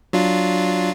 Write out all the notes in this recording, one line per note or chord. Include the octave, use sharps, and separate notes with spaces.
F#3 D4 F4